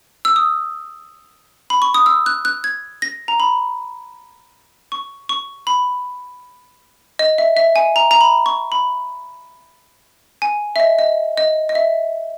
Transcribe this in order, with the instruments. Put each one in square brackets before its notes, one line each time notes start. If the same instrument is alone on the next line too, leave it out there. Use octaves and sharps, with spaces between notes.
[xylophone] E6
D#6
B5
C#6
D#6
E6
F#6
F#6
G#6
A#6
A#5
B5
C#6
C#6
B5
D#5
E5
E5
G#5
A#5
A#5
B5
C#6
B5
G#5
E5
D#5
D#5
D#5
D#5
E5